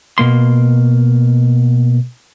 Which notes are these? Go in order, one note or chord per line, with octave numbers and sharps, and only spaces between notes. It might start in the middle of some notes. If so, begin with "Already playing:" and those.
B2 A#3 C6